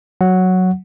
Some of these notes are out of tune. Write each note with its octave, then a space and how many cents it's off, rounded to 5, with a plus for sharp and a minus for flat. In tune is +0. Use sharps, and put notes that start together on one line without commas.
F#3 +0 F#5 +0